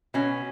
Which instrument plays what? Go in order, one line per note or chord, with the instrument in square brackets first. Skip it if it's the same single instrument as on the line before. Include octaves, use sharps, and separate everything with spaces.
[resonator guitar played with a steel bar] B2 C#4